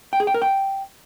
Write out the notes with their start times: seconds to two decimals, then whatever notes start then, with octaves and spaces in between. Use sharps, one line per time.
0.13 G5
0.20 G#4
0.27 G5
0.34 A#4
0.42 G5